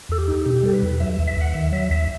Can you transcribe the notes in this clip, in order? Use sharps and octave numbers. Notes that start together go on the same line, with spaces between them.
E2 A4
G4
D#4
B2 G4
G3 A4
B4
E2
F#3 E5
E5
D#2
E5
D#2 F#5
D#3 E5
F#3 E5
D#2 E5